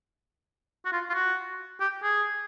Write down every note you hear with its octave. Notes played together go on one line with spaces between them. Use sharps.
F#4
F4
F4
F#4
G4
G#4